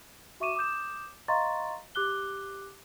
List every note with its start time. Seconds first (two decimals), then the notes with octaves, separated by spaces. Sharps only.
0.40 F#4 E5 C#6 D6 D#7 E7
0.56 D6 D#6 G6 E7
1.28 D#5 F5 A#5 C6 C#6 A6
1.95 G4 D6 F#6 G7